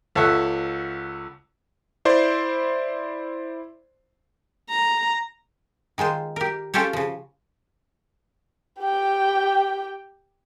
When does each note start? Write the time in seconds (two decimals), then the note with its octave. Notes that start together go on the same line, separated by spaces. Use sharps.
0.15 C#2 A4 C#5 E5 F#5
2.05 E4 C5 D5 C6
4.70 A#5
5.98 D#3 G#3 F4 C5
6.36 G4 A#4
6.74 C#4 F4 G4 A4 C5 C#5
6.93 C#3 F3
8.81 G4 G5